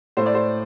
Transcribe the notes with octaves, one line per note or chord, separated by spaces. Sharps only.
A2 C5
D5
C5